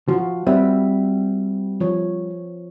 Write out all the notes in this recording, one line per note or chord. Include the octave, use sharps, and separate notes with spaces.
F3 F4 F#4
G3 C4 B4 E5
F3 C#5